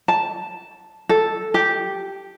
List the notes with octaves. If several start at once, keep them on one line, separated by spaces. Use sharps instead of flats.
A5
A4
G4